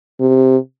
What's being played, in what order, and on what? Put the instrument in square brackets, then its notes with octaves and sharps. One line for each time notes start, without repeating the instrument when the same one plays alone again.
[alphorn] C3